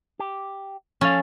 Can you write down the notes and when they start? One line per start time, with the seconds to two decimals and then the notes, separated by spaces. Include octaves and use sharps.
0.19 G4
1.01 F3 C#4 A4 F5